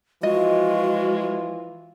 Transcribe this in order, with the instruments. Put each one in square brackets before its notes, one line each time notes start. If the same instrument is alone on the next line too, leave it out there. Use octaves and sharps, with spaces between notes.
[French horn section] E3 F3 F4 [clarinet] G#3 [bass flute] F#4 [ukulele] D#5